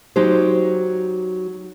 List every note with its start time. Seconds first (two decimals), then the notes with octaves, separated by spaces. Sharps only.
0.16 F#3 D#4 G4 C5